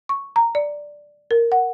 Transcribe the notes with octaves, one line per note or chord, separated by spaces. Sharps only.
C#6
A#5
D5
A#4
F#5